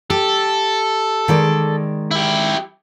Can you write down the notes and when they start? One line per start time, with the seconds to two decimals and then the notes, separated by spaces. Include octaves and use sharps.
0.10 G4 A4
1.28 D#3 G#3 D5
2.11 E4 G4